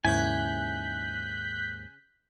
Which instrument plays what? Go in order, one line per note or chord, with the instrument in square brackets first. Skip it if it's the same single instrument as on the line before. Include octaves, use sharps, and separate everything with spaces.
[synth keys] D#2 G#2 [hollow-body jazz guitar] C#3 E4 [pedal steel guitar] G#5 [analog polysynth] F#6 G6 B6